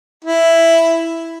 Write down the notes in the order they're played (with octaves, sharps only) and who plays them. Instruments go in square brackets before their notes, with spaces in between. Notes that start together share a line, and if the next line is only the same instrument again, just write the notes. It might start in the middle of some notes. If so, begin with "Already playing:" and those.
[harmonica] E4